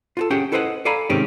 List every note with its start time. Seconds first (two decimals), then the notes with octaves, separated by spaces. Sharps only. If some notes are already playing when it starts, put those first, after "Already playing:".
0.17 F4 F#4 A4
0.30 C#4 G4 G#4 F#5 G5
0.52 E4 A4 B4 C5 D#5 F#5
0.85 A4 D5 F5 G#5 A#5 B5
1.10 G#2 C3 D#3 C4 C#4 G4